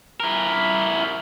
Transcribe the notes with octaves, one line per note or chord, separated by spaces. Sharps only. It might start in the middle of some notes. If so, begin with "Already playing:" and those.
E4 A#4